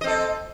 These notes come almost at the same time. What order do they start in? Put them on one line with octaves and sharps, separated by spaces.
D#5 C4 A4